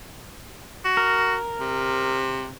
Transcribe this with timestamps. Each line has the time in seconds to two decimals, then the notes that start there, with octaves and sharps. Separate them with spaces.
0.85 F#4
0.97 A#4
1.60 C3